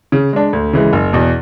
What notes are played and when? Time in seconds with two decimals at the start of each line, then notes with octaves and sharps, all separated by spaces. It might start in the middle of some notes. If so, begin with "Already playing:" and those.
0.12 C#3
0.33 G#3 D4
0.53 D2
0.73 C#3 E3 G#3
0.93 F#1
1.13 E2 B2